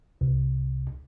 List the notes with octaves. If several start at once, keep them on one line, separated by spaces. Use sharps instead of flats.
C2